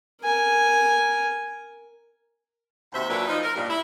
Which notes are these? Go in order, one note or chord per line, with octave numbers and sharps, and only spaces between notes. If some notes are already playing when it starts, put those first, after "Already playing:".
A#4 G#5
D#2 C3 F#4 C5 E5
A#2 F#3 A#3 D4 B4 E5
F3 D#4
A#4
G2 A#2
E4